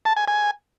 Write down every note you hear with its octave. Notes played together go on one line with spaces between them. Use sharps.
A5
G#5
G#5